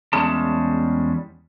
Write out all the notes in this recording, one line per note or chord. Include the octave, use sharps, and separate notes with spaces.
E2 G3 G#3 C#4 A5